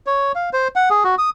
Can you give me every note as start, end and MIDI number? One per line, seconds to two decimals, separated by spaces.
0.06 0.32 73
0.35 0.50 77
0.53 0.68 72
0.76 0.89 78
0.90 1.04 68
1.04 1.15 66
1.18 1.30 87